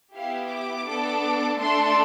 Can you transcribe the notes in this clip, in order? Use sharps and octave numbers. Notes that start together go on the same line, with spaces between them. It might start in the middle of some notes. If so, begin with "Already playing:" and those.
B3 E4 G4 F5
D6
B3 D4 A4
A3 D4 A4 C6